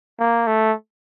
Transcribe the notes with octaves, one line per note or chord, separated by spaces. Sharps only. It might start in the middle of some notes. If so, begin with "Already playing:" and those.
A#3
A3